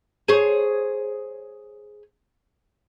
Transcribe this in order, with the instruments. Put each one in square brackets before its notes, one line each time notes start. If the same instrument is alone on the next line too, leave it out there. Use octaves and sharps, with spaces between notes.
[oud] G#4 C5 C#5